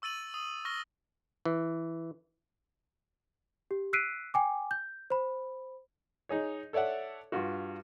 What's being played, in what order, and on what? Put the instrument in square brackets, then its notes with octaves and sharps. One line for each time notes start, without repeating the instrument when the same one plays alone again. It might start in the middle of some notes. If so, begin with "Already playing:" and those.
[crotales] C#6 E6 A6 D#7 F#7
D#6
C#6 F6 A#6 G7
[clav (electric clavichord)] E3
[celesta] G4
E6 F#6 B6 C7 D7 D#7
G5 G#5 D6
G6
C5 B5
[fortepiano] D#4 G#4 C#5
A4 C#5 D5 E5 F#5
G2 F4 F#4